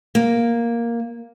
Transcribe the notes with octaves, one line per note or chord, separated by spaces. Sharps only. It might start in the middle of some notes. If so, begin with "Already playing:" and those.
A#3